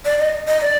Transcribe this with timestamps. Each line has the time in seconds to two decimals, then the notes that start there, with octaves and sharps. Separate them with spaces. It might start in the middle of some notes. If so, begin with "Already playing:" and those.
0.05 D5
0.19 D#5
0.48 D#5
0.62 D5